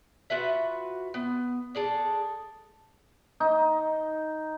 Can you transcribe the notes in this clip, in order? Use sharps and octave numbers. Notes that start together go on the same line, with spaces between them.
F4 F#4 B4 E5
B3
D4 G#4 A4
D#4